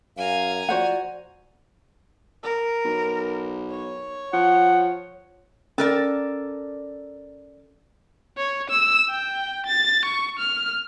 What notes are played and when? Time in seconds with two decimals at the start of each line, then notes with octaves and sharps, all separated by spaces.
0.17 F#2 F5 G#5 A#5
0.69 F3 F#4 C5 D5 F#5
2.43 A#4
2.85 B1
3.70 C#5
4.33 F3 F#5
5.78 C#4 A4 A#4 D5
8.37 C#5
8.70 E6
9.10 G5
9.66 A6
10.05 C#6
10.39 F6